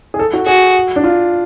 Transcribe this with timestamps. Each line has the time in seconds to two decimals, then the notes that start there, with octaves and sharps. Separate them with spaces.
0.14 G#4
0.19 A4
0.33 F#4
0.46 F#4 G#4
0.96 D4
1.04 F4